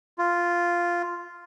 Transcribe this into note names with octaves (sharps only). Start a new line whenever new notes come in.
F4